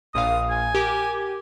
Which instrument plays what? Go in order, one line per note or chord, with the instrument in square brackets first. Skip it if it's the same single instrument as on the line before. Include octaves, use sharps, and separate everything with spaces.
[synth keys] A#1 A#2 F5 [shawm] D#6
[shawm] G#5
[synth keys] G4 A#4 D6